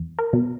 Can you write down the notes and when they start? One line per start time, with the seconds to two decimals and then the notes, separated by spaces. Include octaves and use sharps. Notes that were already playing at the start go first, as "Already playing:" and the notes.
Already playing: E2
0.19 A#4
0.33 B2